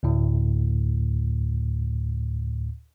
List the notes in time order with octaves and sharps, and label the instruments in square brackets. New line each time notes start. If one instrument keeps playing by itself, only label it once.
[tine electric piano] D2 A2